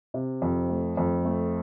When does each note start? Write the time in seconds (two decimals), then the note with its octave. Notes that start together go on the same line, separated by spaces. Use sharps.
0.14 C3
0.42 F2
0.69 A3
0.97 F2
1.25 A3